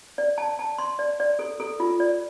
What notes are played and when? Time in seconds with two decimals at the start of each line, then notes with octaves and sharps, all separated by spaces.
0.18 D5
0.38 A5
0.59 A5
0.78 C6
0.99 D5
1.20 D5
1.39 A4
1.60 A4
1.80 F4
2.00 D5